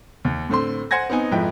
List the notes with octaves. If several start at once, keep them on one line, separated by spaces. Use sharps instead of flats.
D#2
A2 D3 C4 C6
C5 F#5 G#5 G#6 A#6
B3 C4 D#4 G#5
F2 G#2 F3 E4 B4 G5